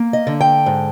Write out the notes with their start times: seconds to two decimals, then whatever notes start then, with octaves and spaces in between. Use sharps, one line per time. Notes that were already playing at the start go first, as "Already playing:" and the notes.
Already playing: A#3
0.13 D#5
0.27 D3
0.41 G5
0.66 G#2